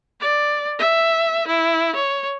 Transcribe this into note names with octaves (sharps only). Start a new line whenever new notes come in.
D5
E5
E4
C#5